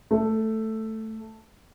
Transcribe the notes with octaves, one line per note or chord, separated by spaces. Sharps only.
A3 A4